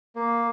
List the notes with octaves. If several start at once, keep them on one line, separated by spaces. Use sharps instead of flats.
A#3